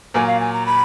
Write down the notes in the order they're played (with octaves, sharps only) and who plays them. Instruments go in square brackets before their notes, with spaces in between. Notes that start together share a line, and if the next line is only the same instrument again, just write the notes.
[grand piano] A#2 F#3 A#3 [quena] G#5
[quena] F5
G#5
A#5
B5